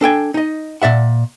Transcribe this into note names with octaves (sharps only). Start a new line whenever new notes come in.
D4 A4 G5 G#5
D#4 D#5
A#2 D5 E5 F#5